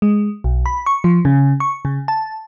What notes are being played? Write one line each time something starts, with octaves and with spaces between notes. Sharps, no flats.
G#3
B1
B5
C#6
F3
C#3
C#6
C#3
A5